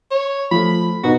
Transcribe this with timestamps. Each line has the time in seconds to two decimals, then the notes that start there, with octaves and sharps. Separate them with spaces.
0.11 C#5
0.51 F3 A3 B5
1.04 B2 D#4 F#4 B4